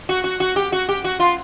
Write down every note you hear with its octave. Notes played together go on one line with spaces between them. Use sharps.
F#4
F#4
F#4
G4
F#4
G4
F#4
F4